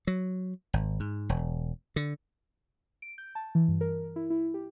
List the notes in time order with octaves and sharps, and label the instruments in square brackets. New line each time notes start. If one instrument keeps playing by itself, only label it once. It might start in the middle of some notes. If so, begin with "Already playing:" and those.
[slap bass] F#3
G#1
G#2
E1
D3
[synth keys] D7
G6
A5
E3
G2
A#4
E4
E4
G4